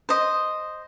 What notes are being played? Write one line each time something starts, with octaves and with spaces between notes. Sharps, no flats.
C5 D#5